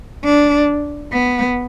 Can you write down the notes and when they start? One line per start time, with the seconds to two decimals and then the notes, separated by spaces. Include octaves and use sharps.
0.25 D4
1.12 B3